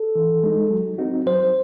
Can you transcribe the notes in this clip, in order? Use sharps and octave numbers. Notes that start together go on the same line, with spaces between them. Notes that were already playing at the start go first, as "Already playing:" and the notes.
Already playing: A4
E3
G#3 D#4
F#3
C4 D#4 F#4
F#3 C5